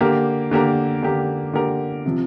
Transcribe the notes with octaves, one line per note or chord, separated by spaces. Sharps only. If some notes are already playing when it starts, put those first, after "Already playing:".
D3 A#3 G4 A#4
D3 A#3 G4 A#4
D3 A#3 G4 A#4
D3 A#3 G4 A#4
C3 F3